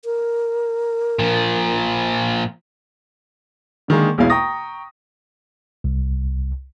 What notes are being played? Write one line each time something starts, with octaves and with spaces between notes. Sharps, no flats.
A#4
A#2 F3
D3 D#3 G#3 A#3
B1 E2 G#3 E4 F5 G#5
G5 A#5 C#6 D#6 A#6
C2